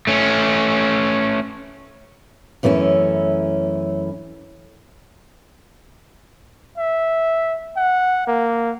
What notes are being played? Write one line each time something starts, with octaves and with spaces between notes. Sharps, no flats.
A3 C#4
F#2 E3 A3 B3 C#4
E5
F#5
A#3